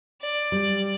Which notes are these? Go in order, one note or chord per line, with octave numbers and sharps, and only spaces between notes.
D5
G3